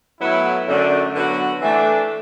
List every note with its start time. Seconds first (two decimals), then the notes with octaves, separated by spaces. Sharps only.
0.20 A2 F#3 B3 E4
0.68 F#2 D3 A3
1.14 D3 F#3 B3 F#4
1.61 E3 A3 D4